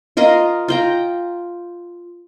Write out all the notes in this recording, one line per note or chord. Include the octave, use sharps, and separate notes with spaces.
F4 A#4 D#5 F5
F4 G5 A#5